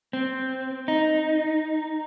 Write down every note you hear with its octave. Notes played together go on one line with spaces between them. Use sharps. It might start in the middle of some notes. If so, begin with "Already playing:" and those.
C4
D#4